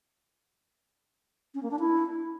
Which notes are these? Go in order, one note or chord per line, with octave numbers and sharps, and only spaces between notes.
C#4
A#3
D4
E4